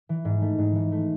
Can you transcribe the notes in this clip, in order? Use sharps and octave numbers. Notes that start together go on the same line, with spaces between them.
E3
G#2
A3
G#2
E3
A3